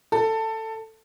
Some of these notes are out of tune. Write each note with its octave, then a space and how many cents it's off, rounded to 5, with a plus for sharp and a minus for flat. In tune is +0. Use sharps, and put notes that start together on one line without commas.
A4 +15